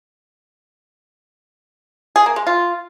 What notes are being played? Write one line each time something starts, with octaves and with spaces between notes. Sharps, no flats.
G#4
A#3
G#3
F4